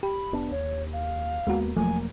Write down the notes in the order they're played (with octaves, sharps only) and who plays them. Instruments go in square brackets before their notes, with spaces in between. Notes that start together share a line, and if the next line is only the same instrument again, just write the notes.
[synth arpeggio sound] G4 [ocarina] B5
[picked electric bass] F1 B3 D4
[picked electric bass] D#2 [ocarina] C#5
[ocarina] F5
[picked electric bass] D#2 A#3 B3 [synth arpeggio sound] G#3 F#4
[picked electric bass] E1 A#3 [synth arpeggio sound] F3 F#3 A3 [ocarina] G#5